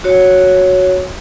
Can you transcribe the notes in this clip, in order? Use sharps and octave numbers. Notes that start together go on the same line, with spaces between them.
F#4 C#5